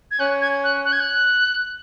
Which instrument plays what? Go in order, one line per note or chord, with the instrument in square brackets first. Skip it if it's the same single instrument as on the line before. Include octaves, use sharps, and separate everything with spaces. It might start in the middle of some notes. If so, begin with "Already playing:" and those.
[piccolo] G#6
[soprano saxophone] C#4 [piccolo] F#6
[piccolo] G#6
F#6
F#6
G#6
F#6